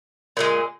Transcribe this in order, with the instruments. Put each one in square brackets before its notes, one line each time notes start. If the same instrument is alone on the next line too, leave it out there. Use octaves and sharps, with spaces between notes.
[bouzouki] A#2 F3 G#3